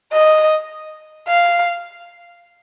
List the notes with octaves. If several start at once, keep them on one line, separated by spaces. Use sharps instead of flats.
D#5
F5